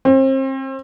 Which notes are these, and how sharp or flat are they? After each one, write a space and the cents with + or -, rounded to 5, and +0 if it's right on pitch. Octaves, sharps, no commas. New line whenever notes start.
C4 +35